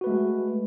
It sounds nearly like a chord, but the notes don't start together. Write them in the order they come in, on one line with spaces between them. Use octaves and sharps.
F#4 B4 A3 G#3